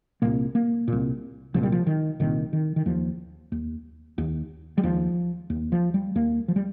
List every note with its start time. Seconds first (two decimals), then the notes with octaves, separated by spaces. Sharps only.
0.22 C2 A#2 A#3
0.55 A#3
0.88 C2 A#2
1.54 C2 A#2 F3
1.63 G3
1.72 F3
1.87 D#3
2.20 C2 A#2 D#3
2.53 D#3
2.76 D#3
2.86 D#2 F3
3.52 D#2
4.18 D#2
4.78 G3
4.83 D#2 F3
5.50 D#2
5.72 F3
5.94 G3
6.15 D#2 A#3
6.48 F3
6.56 G3